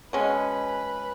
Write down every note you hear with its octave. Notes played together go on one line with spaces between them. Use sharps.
B2 G#3 C#4 B4